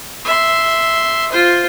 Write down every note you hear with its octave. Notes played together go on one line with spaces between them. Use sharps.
E5 C6
F4 C5